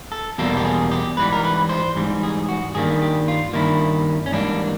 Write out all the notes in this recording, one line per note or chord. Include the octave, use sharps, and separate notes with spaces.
A4
E2 B2 G3 A#3 A4
G4
G#4
G4
G#2 E3 G3 B4
A#4
B4
C5
G#2 E3 G3
G#4
F#4
G2 D#3 G3 A#3 G#4
G4
F4
G2 D#3 G3 A#3 E4
C#4
G#2 E3 G3 A#3 D4